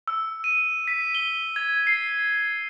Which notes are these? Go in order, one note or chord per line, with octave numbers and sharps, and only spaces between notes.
E6
D#7
B6
G7
G#6
C7